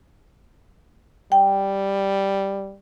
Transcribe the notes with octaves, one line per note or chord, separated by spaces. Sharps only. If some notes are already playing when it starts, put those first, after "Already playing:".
G3 G5